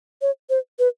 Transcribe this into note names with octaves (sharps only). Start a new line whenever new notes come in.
C#5
C5
B4